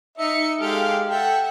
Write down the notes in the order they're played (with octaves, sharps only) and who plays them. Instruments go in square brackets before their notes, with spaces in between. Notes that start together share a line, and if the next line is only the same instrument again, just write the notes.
[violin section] D#4 C#7 [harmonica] E5
[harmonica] G#3 A4 F6 [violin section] G4 F5
[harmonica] A4 G5 [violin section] E5 F#5